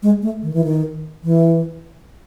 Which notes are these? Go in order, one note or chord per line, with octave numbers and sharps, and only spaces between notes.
G#3
A3
D#3
E3
D#3
E3